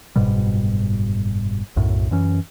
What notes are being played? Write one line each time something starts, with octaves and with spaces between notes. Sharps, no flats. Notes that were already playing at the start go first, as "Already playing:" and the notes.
F#1 G#2 B2 G3
B1 F#2 A2
F#2 E3 C#4